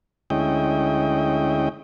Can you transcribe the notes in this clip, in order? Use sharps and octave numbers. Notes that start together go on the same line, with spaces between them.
D2 G#3 C#4 E4 D#5 G5